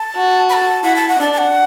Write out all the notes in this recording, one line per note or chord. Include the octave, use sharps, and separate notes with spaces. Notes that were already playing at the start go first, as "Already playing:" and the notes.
Already playing: A5
F#4
B5
A5
E4 F#5
A5
F#5
D4 A5
A5
F#5